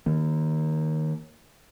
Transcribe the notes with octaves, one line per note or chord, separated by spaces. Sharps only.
D#3 A#3